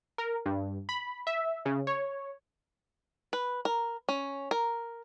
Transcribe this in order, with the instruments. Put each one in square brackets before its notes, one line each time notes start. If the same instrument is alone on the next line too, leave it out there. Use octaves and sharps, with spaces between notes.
[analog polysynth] A#4
G2
B5
E5
C#3
C#5
[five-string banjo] B4
A#4
C#4
A#4